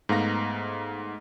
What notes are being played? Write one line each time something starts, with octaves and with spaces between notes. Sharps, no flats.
G#2 A3 B3 F5 A#5 A#6